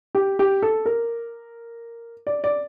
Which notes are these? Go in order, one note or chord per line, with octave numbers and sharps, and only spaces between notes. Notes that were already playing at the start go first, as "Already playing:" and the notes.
G4
G4
A4
A#4
D5
D5